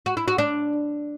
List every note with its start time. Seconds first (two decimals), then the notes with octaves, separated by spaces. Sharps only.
0.06 F#4
0.17 E4
0.28 F#4
0.38 D4